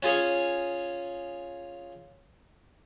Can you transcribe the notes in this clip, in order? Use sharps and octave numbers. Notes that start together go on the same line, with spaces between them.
C#4 F4 G#4 C#5